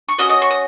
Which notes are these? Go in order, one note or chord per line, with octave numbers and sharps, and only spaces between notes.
C#6
C#4 F#4 D#5 D#6
D#5 D#6
C#6
D#6